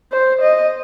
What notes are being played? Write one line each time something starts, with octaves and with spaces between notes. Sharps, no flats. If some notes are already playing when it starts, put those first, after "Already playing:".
C5
D#5